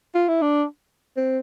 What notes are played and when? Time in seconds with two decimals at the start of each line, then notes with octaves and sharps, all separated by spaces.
0.15 F4
0.28 E4
0.42 D4
1.16 C4